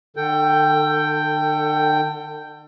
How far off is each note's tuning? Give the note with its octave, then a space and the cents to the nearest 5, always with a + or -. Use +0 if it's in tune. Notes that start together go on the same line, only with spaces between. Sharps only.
D3 +45 A4 +25 G5 +0